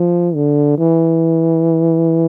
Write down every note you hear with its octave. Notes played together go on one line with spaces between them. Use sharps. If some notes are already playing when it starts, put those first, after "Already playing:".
Already playing: F3
D3
E3